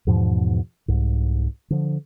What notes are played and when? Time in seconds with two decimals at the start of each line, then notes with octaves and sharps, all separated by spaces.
0.07 E2 G#2 B2 F3
0.88 C2 G#2
1.70 D3 F3